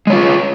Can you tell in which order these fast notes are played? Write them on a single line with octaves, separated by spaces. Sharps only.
G#3 C#5 F4 G#4